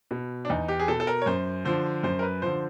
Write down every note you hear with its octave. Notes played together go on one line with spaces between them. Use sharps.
B2
D4
E2 D#4
G4
G#4
B2 A4
A4
A#4
C#5
F#2 C5
D3 F3 C5
F#2 C5
A#4
B4
D3 F3 C5